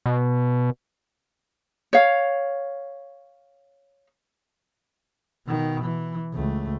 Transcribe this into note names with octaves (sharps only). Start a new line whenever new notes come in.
B2
C#5 F5
B2 D#3
E3
C#2 A3